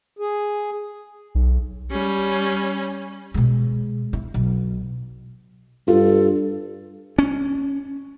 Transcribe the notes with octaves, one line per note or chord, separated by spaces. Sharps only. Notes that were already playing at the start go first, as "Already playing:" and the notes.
G#4
B1
G3 C#4
B2 G#3
E4
B1
G2 F4 A4
C#4